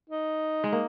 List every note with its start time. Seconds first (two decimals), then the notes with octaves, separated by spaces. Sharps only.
0.10 D#4
0.64 G#3
0.72 A#3